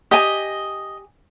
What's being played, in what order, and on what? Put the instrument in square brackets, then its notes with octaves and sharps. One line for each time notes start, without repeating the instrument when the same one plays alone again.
[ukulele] G4 G#5 [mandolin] D#5